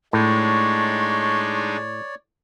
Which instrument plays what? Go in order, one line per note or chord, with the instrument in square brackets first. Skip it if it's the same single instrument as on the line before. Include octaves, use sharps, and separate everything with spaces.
[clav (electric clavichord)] A2 [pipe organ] G#3 D4 D#4 [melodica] C#5 D5 [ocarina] C#6